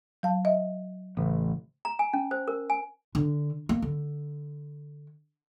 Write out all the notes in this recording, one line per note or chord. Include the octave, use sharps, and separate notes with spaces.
F#3 F5 A5
D#5 E5
A1 C#3
A#5
G#5
C#4
C5
A#4
G#5
D3
A#3
D3